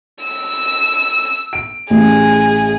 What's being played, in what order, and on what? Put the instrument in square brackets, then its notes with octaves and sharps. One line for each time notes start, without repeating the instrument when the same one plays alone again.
[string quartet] E6
[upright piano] D7
[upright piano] A1 [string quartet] G#4